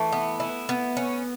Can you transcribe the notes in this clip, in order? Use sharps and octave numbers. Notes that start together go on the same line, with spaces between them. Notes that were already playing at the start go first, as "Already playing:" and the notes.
Already playing: E3 A3
B3
E4
B3
C#4